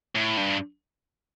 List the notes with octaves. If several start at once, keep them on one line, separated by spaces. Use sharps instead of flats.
A2
G2